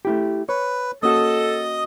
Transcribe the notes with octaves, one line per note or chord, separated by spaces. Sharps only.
A3 E4 G4
B4 C#5
A#3 C#4 F#4 A4 D#5 D#6